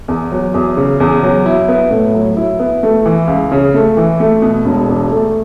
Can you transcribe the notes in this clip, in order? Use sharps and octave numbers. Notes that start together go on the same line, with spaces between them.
E2
F#3
E2
C#3
E2
F#3
E4
B3
A2
F#3
E4
B3
A3
E3
C#2
C#3
A3
E3
A3
B2
E1
E2
A3